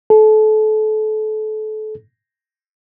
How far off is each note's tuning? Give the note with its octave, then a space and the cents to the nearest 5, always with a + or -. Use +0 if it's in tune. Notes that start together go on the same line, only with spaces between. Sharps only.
A4 -30